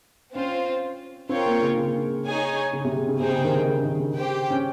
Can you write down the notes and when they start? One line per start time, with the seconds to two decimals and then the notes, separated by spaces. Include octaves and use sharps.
0.35 C4 C#4 F4 C5
1.29 C4 F4 A#4 C#5 G5
1.46 A#3
1.62 C#3
1.77 C#3
2.25 D#4 G#4 C#5 G#5
2.73 C#3
2.85 C3
2.96 C#3
3.08 C#3
3.20 C3 D#4 G#4 C5 G5
3.32 C#3
3.44 D#3
3.56 C#3
3.67 C#3
3.83 D#3
4.00 C#3
4.15 G4 C5 G5
4.50 C#4